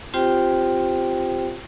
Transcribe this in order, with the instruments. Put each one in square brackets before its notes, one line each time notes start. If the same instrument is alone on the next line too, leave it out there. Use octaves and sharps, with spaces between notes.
[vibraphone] C4 F4 G4 C5 G5